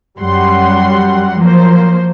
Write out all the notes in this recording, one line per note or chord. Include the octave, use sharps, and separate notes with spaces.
F#2 F#3 G3 F#5 C6
F3 F#3 A#3 C5